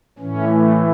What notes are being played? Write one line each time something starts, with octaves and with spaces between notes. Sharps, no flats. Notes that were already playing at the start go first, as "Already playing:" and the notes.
A2 E3 C#4
A3